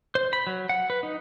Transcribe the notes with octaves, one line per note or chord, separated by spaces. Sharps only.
C5
B5
F#3
F#5
B4
D#4